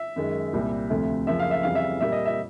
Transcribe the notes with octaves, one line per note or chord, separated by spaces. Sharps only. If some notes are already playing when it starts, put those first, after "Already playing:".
Already playing: E5
F#2 D#3 G#3
C2 A#2 G3
D2 C3 F3 A3
F#2 C#3 F3 A#3 E5
F5
E5
F2 C#3 E3 G3 F5
E5
A#2 G3 A#3 E5
D#5
E5